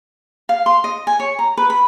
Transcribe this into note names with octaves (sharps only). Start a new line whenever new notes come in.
F5
C6
D#5
G#5
C#5
A#5
B4
B5